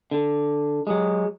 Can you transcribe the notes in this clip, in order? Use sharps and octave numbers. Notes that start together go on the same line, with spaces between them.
D3
F#3 G#3